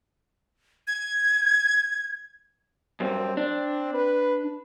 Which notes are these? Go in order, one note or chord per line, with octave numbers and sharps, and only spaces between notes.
G#6
F#2 G3 C4
C4 D4
B4